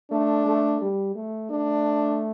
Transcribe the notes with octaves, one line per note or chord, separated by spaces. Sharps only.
A3 D4
A3
G3
A3
A3 D4